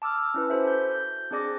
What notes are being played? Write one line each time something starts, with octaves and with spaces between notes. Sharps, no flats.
A5 D6 E6 F6
C#4 E4 B4
F#4 A4 C5 E5
A4 G6
G6
C4 D4 G#4 D5 D6 A#6